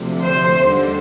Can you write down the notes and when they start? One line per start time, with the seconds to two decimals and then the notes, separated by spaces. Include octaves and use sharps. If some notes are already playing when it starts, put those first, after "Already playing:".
Already playing: D2 C3 F3
0.21 C5
0.62 D#2 D3 G3